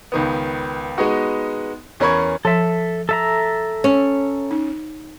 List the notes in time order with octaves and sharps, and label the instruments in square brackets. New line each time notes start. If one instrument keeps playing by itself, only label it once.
[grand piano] C#2 D#3 B3
G#3 B3 D#4 F#4
E2 C#4 A#4 B5 C#6 G#6
[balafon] F3 [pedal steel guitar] A4 E5
[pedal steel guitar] A4 E5 A#5
[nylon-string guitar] C#4
[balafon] D#4